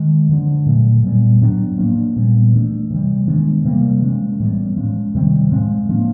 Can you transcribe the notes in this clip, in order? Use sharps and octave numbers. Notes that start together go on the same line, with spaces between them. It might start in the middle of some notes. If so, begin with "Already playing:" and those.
Already playing: D#3 G#3
D3 F3 A3 D4
A#2 F#3 A3
A#2 G3 B3
A2 F#3 B3 D4
F3 A#3 D4
A#2 G3 B3
E3 A3 D4
C3 E3 G3
D#3 G#3 B3 D4
C3 E3 G3 A#3
F3 G#3 C#4
A2 E3 G3 B3
F3 G#3 C#4
C3 D#3 G3 C4
A2 F3 G#3 C4
F3 A#3 D4